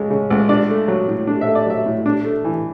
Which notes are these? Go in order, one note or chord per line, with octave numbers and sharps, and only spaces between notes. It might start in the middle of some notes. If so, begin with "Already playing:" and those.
Already playing: C#2 G#3 C#4
C#3
C#2
D4 D5
A3
F#3
A2
D4
E5
A3
D5
F#3 E5
A2
D4
A3
E3